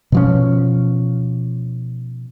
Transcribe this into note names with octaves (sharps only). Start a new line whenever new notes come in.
B2 F3 C#4